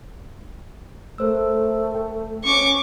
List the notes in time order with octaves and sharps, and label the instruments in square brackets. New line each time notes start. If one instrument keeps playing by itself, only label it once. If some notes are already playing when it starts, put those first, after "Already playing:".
[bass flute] A3 [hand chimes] A#4 C5 E6
[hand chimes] G5
[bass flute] C#4 [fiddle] C#6 D6